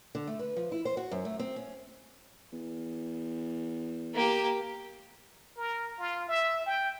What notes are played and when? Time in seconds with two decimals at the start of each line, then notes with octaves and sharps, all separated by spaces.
0.15 D3
0.27 A3
0.39 B4
0.57 F3
0.72 E4
0.85 C5
0.97 F#4
1.11 F#2
1.25 A3
1.39 C4
1.56 C#4
2.52 E2
4.14 A#3 G4
5.57 A#4
5.99 F4
6.28 E5
6.66 G5